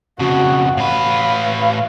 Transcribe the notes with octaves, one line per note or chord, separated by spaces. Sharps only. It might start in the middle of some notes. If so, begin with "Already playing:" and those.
F2 C#3 F#4
A2 B4 F5